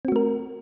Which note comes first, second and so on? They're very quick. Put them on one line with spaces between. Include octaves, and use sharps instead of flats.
C4 F#4 A3 A#4